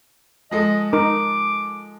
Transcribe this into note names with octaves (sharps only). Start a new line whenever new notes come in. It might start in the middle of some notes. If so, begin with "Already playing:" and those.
F3 G#3 A4 D#5
D#4 A#4 D6